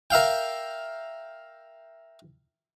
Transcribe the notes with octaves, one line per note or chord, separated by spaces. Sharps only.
A#4 E5 F5 G5